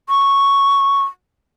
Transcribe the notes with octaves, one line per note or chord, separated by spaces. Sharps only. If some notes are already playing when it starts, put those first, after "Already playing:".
C#6